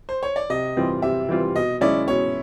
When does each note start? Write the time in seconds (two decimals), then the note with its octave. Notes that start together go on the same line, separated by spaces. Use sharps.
0.09 C5
0.23 C#5
0.36 D5
0.50 C3 D#5
0.77 E3 G3 C4 F4
1.02 C3 E5
1.29 E3 G3 C4 F4
1.56 B2 D#5
1.81 G#3 C#4 E4 D5
2.08 B2 C#5